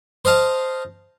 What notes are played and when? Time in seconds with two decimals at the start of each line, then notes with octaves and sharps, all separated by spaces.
0.25 C5 D#5 F5 A5